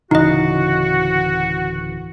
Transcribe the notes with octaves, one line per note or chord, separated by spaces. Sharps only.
D1 C#3 E3 D#4 F#4 D#5